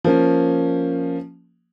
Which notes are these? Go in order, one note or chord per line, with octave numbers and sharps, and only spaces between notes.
F3 A#3 C#4